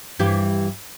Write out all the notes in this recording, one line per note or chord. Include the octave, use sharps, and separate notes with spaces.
G2 E3 G4